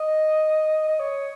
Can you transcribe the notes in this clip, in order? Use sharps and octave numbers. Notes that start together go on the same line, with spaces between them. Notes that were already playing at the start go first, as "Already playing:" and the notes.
Already playing: D#5
D#5
C#5